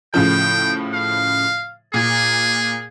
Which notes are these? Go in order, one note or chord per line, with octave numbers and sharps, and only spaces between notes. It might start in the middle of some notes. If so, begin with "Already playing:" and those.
A2 C#3 F3 G5
F5
A#2 G#4